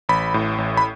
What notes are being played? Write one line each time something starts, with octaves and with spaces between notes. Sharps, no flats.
A1 B5
A2
A1
B5